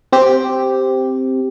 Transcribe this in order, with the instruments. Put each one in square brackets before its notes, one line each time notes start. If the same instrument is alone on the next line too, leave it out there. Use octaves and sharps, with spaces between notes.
[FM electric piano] C4 G4